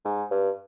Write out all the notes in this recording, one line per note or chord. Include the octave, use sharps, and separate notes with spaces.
G#2
G2